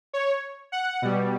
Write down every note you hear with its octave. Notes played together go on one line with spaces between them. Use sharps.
C#5
F#5
B2 G3